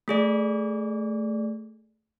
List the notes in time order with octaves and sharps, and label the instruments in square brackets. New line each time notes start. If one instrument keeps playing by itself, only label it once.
[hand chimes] A3 G#4 D5